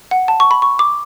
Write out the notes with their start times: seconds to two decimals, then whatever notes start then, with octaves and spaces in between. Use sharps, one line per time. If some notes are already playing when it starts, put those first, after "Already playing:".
0.11 F#5
0.28 A5
0.40 C#6
0.51 B5
0.62 C#6
0.79 D6